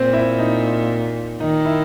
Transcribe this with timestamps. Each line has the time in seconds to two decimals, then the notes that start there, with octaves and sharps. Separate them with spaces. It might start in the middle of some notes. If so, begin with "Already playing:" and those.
Already playing: A#2 C4 C5
0.13 E4 E5
0.38 D#4 D#5
1.40 D#3 D#4 D#5
1.65 E4 E5